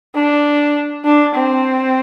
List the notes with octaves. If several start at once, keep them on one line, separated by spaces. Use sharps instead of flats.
D4
D4
C4